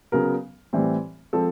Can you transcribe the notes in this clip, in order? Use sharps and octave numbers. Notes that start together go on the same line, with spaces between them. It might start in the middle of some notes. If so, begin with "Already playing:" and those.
C#3 F#3 B3 A#4
A2 E3 G3 C4
F3 G#3 C4 A4